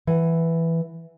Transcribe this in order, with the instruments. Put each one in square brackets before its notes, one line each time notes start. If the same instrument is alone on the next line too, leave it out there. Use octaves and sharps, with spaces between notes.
[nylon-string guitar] E3 F#5